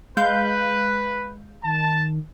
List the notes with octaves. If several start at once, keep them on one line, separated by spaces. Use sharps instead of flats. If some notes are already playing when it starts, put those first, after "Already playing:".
G#3 B4 F5 F#6 G6
D#3 A5